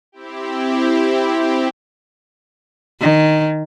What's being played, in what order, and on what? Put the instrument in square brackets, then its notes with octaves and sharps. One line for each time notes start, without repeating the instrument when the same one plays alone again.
[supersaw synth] C4 E4 G4
[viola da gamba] D#3